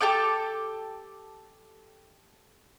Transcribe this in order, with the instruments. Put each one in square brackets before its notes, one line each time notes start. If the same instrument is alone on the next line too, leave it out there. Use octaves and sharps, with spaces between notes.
[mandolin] G4 A4 G5 D6